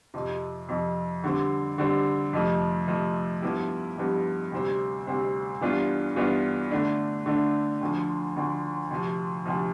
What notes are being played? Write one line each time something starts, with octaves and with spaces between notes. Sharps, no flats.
F2 C3 F3
F2 C3 F3
D3 G3 C4
D3 G3 C4
F2 C3 F3 A3
F2 C3 F3 A3
G2 F3 B3 E4 G4
G2 F3 B3 E4 G4
D2 C3 G3 C4
D2 C3 G3 C4
G2 E3 B3 D4 F4
G2 E3 B3 D4 F4
D3 A3 D4
D3 A3 D4
D2 D3 F3
D2 D3 F3
D2 C3 F3
D2 C3 F3